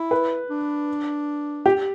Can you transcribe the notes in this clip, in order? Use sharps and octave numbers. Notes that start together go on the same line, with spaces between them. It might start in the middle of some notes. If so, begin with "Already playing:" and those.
Already playing: E4
B4
D4
G4